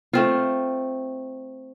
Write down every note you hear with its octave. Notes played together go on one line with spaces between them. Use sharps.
A3 C4 F4